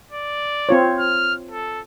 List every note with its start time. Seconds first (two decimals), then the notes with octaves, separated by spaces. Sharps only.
0.12 D5
0.69 C4 F4 C#5
0.99 F6
1.51 A4